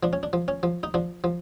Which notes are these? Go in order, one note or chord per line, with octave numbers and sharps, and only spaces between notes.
F3 D4
C#4
D4
F3
C#4
F3
D#4
F3 D4
F3